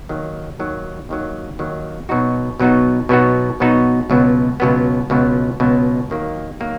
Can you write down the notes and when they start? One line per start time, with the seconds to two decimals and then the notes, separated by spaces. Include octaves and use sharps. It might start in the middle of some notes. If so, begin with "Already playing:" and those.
0.09 D#2 D#3 F#3
0.59 D#2 D#3 F#3
1.09 D#2 D#3 F#3
1.59 D#2 D#3 F#3
2.09 B2 F#3 B3 D#4 F#4
2.60 B2 F#3 B3 D#4 F#4
3.09 B2 F#3 B3 D#4 F#4
3.60 B2 F#3 B3 D#4 F#4
4.10 C#2 B2 F#3 B3
4.60 C#2 B2 F#3 B3
5.10 C#2 B2 F#3 B3
5.60 C#2 B2 F#3 B3
6.10 D#2 D#3 F#3 A#3
6.60 D#3 F#3 A#3